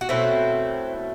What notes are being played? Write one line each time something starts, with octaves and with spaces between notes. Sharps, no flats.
F#4
B2 F#3 A3 C4 E4